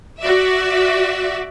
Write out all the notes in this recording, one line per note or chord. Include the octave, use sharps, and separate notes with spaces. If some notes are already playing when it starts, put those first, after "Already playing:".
F#4 D5 E5